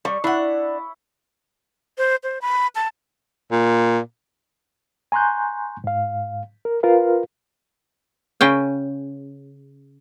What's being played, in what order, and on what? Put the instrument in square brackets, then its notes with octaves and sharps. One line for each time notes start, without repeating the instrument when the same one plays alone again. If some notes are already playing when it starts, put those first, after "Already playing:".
[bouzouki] G3 [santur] C#6
[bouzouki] D4 F#5 [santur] E4
[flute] C5
C5
B5
A5
[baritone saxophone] A#2
[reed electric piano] G#5 A#5 C6 C#6 F#6 G6
G#2 F5
A#4
F4 A#4 B4 F5
[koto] C#3 C#4 G5